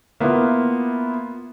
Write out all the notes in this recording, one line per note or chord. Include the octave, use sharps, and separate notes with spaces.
A#3 B3 E4 F4